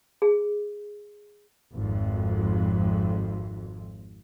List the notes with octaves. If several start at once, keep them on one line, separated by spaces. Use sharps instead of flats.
G#4
G#1 F2